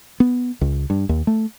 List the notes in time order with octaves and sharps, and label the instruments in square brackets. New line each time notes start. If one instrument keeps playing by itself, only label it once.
[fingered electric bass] B3
C#2
G2
D#2
A3